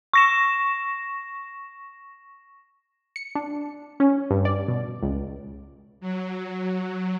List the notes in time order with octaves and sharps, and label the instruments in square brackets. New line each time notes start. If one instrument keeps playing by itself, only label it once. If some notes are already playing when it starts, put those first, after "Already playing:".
[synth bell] C#6 A#6 E7
[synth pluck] C#7
D4
C#4
G2
D5
B2
C#2
[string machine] F#3